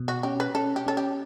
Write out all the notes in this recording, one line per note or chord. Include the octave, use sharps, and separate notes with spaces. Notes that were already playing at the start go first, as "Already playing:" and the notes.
Already playing: B2
F#4
C#4 G4
B4
C#4 A4
G4
C#4 A4
G4